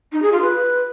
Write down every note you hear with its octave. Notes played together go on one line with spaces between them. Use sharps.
D#4
G#4
F4
B4